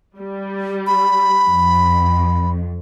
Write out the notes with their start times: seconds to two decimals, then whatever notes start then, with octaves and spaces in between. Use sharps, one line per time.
0.17 G3
0.87 B5
1.48 F2